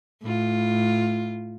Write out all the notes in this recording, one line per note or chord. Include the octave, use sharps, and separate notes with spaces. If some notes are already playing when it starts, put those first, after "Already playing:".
A2 F4